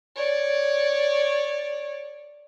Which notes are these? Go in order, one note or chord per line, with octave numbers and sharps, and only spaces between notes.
C#5 D5